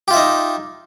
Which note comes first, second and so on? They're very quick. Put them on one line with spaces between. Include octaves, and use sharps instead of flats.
G4 F4 E5 D#4